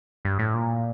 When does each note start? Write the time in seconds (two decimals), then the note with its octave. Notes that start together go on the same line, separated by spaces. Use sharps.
0.25 G2
0.39 A2
0.54 A#2